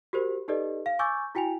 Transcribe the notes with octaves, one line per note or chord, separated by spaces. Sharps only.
F#4 G4 A#4 C5
D#4 G4 A4 B4 D5 D#5
F5
G#5 C#6 D6 E6 G6 A6
E4 F#4 G5 G#5 F7